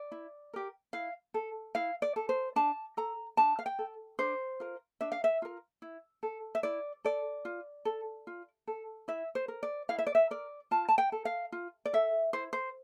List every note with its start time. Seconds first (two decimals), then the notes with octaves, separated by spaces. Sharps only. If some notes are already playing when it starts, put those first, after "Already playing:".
Already playing: D5
0.12 E4
0.53 G4 A#4
0.93 E4 F5
1.34 A4
1.75 E4 F5
2.02 D5
2.16 A4
2.29 C5
2.56 D4 A5
2.97 A4 A#5
3.37 D4 A5
3.59 F5
3.66 G5
3.79 A4
4.19 D4 C5
4.60 F4 A#4
5.01 D4 E5
5.12 F5
5.24 E5
5.42 F4 A#4
5.82 E4
6.23 A4
6.55 E5
6.63 E4 D5
7.05 A4 D5
7.45 F4
7.85 A4
8.27 F4
8.67 A4
9.08 E4 E5
9.35 C5
9.48 A#4
9.63 D5
9.89 E4 F5
9.99 E5
10.07 D5
10.15 E5
10.31 A#4 D5
10.71 F4 A5
10.89 A5
10.98 G5
11.12 A4
11.25 F5
11.52 F4
11.85 D5
11.93 A4 E5
12.33 E4 C5
12.53 C5